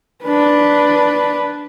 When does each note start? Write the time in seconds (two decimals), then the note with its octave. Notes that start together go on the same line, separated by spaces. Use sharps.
0.24 D4 B4